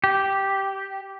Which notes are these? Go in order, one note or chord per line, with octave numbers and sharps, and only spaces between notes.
G4